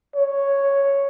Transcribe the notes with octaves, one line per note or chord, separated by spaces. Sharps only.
C#5